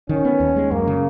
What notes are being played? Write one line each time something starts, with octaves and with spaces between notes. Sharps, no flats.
D#3 C#4
B3
D#2
G#3
F#2 A#3
C#3